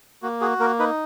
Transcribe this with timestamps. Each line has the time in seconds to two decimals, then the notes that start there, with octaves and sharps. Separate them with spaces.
0.23 A#3 F#4
0.41 F#4 G#4
0.60 A#3 A#4
0.79 D#4 B4